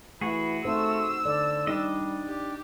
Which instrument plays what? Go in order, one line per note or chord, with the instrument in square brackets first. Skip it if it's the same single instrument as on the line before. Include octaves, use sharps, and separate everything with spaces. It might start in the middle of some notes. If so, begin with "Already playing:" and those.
[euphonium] E3 [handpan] A3 [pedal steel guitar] F#4 G#4 [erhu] B5
[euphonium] A3 [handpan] C4 D#4 C5 [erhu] E6
[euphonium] D3 [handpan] D5
[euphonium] G3 [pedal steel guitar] D4 D#5 [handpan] D#4
[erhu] G4